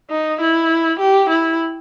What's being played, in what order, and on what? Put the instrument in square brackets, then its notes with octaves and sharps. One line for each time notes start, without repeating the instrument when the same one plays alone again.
[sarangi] D#4
E4
G4
E4